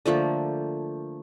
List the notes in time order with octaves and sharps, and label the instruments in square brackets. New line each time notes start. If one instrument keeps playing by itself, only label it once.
[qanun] D3 F3 A3 A#3